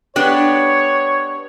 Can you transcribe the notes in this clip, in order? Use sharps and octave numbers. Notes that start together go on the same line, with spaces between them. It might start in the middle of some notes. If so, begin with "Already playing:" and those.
B3 D4 G4 C#5